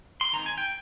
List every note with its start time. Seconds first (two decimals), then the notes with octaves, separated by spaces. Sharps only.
0.21 C6
0.33 D#3 G#3 C4 A#5
0.46 G#5
0.58 G5